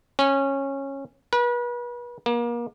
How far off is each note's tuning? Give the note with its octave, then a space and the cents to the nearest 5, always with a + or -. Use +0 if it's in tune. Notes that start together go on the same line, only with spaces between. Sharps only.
C#4 -15
B4 -35
A#3 +35